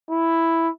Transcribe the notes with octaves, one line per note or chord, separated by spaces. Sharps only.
E4